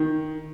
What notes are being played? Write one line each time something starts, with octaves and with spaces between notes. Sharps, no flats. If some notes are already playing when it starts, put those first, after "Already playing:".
Already playing: D#3